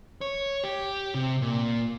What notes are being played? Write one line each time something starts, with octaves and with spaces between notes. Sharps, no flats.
C#5
G4
C3
A#2